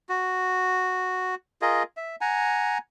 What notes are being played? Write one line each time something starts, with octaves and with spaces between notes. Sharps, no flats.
F#4
F4 G#4 A#4 D#5
E5
F#5 G#5 A#5